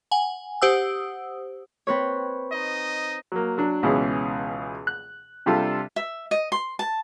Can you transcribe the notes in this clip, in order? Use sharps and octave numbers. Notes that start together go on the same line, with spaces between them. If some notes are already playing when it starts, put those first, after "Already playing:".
F#5 G#5
G4 C5 F#5 D#6 E6
C4 B4 C#5
D#4 D#5
F#3 A#3
F#3 D4
C#2 B2 E3 C#4 G#4
F#6
C3 G3 D4 F4 A4
E5
D#5
C6
A5